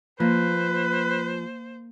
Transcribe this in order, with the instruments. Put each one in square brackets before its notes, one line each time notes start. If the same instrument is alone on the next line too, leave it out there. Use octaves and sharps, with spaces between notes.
[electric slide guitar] F3 [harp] A#3 [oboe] B4 [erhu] C5